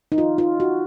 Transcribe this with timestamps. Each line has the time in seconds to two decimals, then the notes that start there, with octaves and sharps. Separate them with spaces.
0.12 D#4
0.18 F4
0.38 F4
0.60 F#4